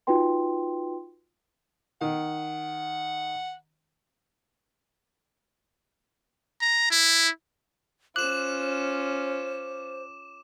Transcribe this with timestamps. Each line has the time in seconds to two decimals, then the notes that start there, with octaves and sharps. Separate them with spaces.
0.07 D#4 F4 F#4 B4 G5 C6
2.01 D#3 F#5
6.61 A#5
6.91 E4
8.16 C#4 F4 C5 D6 F#6 E7